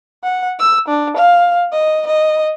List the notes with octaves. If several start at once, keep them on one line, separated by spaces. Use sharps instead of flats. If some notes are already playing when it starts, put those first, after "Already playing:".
F#5
E6
D4
F5
D#5
D#5